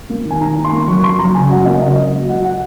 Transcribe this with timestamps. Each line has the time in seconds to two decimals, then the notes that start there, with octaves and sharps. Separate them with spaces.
0.10 A#3
0.25 D#3
0.31 G#5
0.40 D#3 A#5
0.56 D#3
0.64 C6
0.72 A#3
0.87 F#2 C#6
1.04 F#2 C6
1.19 F#2 A#5
1.35 C#3 G#5
1.50 F#3 F#5
1.65 A#3 D#5
1.81 C#3 D#5
1.97 F#3
2.13 F#3
2.28 F#3 F#5
2.44 F#5